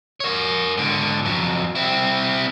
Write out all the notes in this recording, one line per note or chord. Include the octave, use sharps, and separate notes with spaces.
A#4 C#5
G#2 D3
F2 F#3
C4 E4